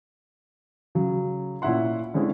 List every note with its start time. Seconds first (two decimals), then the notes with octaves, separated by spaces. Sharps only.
0.95 C#3 F#3
1.62 A#2 C#4 E4 E5 F#5 C6
2.14 D3 G#3 C4 C#4 E4